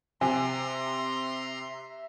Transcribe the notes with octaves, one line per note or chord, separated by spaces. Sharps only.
C3 E5 G#5 A#5 C6